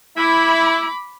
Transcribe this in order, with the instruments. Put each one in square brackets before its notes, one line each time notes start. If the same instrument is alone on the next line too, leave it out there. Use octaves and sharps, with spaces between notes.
[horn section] E4 [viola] B5 D6